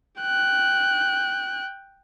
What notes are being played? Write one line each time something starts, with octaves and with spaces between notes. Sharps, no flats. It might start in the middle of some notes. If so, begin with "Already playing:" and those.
G5 F#6